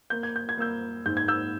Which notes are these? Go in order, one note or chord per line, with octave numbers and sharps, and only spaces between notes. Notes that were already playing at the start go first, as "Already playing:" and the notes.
A#3 G6
G#6
G6
G#6
A#3 E6 G6
G#2 G6
G#6
E6 G6